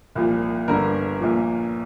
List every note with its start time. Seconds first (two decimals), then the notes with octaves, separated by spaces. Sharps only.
0.15 C2 A#2 F3
0.68 G1 G2 D3 A#4
1.20 A#1 A#2 F3